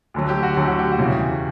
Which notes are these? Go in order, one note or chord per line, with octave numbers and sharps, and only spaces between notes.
D2 D3 F#3
G4
F#4
D2 D3 F#3 G4
F#4
G4
F#4
E2 C#3 E3 G3